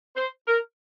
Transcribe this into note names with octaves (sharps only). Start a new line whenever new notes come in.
C5
A#4